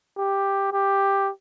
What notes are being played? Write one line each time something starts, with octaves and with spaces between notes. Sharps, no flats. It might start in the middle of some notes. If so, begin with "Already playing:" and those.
G4
G4